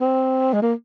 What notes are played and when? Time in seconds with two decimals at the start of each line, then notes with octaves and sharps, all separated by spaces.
0.01 C4
0.53 G#3
0.62 A#3